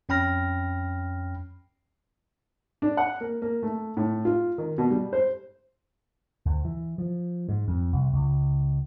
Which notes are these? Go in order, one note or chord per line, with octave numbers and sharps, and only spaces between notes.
F2 C#4 G5 B5 F6 A#6
D4
F#5
A#3
A#3
A3
A2
F4
D#3
B2
G3
C5
D2
E3
F3
G#2
F2
C2
C#2